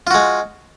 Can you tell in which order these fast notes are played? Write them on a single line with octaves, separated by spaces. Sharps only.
F4 F#4 G#3